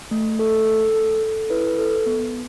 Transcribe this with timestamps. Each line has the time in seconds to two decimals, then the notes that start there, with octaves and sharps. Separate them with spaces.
0.11 A3
0.39 A4
0.67 A4
0.94 A4
1.23 A4
1.50 E4 B4
1.78 A4
2.06 B3